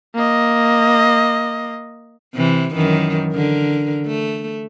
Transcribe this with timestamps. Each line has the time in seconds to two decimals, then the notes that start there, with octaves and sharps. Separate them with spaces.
0.15 A#3 D#5
2.35 C3 E3
2.75 F#2 D#3 E3
3.33 D3 A#4
4.06 A3